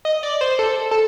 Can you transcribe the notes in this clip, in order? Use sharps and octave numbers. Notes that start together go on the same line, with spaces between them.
D#5
D5
C5
A4
A4